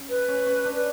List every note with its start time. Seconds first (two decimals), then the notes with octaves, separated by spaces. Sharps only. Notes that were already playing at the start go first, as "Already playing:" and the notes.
Already playing: C#4
0.09 B4
0.28 C#4
0.46 C#4
0.65 D4
0.75 B4